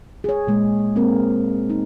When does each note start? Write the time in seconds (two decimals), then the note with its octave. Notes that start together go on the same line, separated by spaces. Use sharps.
0.24 G#4 C#5
0.47 A#2 G#3
0.96 A#3 C4 G#4 A#4
1.70 D#4